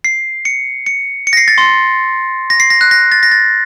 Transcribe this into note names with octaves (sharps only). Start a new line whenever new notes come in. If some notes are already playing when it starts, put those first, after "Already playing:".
C7
C#7
C#7
C#7
A#6
C7
A6
C6
A#6
C7
A#6
F#6
A#6
A6
A#6
A6